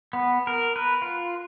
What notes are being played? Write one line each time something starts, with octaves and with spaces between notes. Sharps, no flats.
B3
A#4
B4
F4